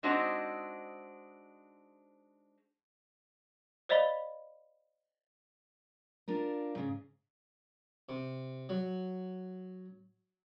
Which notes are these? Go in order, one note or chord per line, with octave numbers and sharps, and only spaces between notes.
G#3 C4 D4 D#4 F#4 C5
C5 D5 D#5 F5 B5 G7
D4 F4 A#4
G#2 C#3
C3
F#3